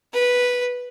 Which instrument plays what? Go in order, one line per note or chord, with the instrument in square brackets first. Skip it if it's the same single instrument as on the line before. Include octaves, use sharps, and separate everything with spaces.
[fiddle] B4